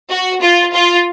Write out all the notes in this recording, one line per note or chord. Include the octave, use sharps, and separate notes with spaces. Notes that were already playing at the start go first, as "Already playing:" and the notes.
F#4
F4
F4